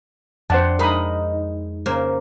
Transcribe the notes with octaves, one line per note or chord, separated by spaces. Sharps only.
F2 D4 C5 F#5 A5
G#3 D#4 A#4 B5 D#6
C#3 A#3 C5